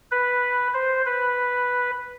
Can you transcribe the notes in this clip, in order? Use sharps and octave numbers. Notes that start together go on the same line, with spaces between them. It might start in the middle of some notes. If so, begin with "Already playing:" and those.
B4
C5
B4